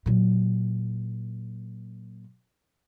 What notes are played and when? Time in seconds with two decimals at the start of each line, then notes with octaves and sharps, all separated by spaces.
0.06 A#2 F#3